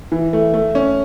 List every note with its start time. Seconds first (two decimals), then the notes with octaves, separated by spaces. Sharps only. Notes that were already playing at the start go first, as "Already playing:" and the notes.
0.12 E3
0.33 A3
0.54 A3
0.75 C#4